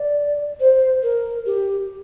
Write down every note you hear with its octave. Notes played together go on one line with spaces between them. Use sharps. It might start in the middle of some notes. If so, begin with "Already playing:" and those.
Already playing: D5
C5
A#4
G4